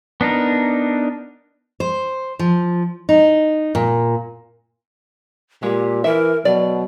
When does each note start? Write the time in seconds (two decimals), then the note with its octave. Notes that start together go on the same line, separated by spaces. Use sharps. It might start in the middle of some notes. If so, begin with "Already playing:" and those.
0.21 B3 D4 D#4 A#4
1.80 C5
2.39 F3
3.09 D#4
3.75 A#2
5.63 A#2 G#3 G4
6.04 E3 A#4 E5
6.45 B2 F#3 D5